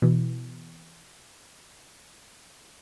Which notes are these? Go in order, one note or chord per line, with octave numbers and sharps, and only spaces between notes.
B2 E3